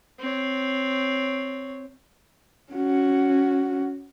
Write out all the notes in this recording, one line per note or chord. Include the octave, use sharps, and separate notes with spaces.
C4 C#5
C#4 F#4